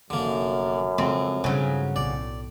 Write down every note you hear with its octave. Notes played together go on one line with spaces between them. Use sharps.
F1 F#2 D3 A#3
F2 C#3 G#3 C4
G2 C#3 F#3
B1 A2 D5